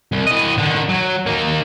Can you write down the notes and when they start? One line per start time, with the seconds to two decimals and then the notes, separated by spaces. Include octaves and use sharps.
0.12 C2
0.26 E3 D#5
0.58 D3 D#3
0.89 F#3
1.26 A#3 D#4